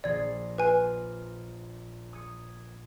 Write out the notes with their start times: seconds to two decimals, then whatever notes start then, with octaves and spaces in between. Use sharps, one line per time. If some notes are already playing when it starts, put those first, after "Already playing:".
0.04 A#1 D5 D#6 G#6 C7
0.58 F4 B4 G#5
2.13 D#6 G#6 C#7